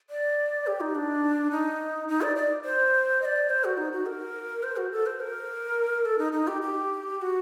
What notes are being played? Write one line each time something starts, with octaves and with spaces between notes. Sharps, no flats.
D5
G4
D#4
D4
D#4
D#4
D5
D5
C5
D#5
D5
C5
F#4
D#4
F#4
A#4
C5
F#4
A4
C5
A#4
A4
D#4
D#4
G4
G4
G4
F#4